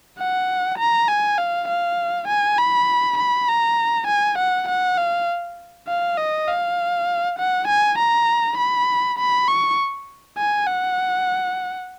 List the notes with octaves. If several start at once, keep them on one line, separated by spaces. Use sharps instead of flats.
F#5
A#5
G#5
F5
F5
G#5
B5
B5
A#5
G#5
F#5
F#5
F5
F5
D#5
F5
F#5
G#5
A#5
B5
B5
C#6
G#5
F#5